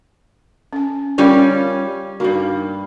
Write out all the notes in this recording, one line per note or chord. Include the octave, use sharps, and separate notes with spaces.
C#4 G#5
G3 C#4 F4 A#4 D5 F5
G2 A#3 D#4 F#4